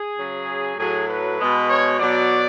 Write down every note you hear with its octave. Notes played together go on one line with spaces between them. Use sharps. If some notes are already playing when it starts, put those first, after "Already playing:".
Already playing: G#4
C#3 F#3
A2 F#3 G#4
B4
B2 G#3
C#5
B2 F#3 D5